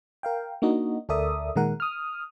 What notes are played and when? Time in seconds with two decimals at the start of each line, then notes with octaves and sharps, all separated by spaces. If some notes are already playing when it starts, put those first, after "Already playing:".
0.23 A#4 F5 G5
0.62 A#3 D4 D#4 F#4 D#5
1.09 D2 A4 A#4 D5 E5 D#6
1.56 A#2 D#3 G#3 A#4 F#5
1.80 D#6 F6